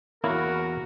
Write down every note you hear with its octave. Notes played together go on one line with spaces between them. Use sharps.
E2 A#3 E4 F#4 A#4 C#5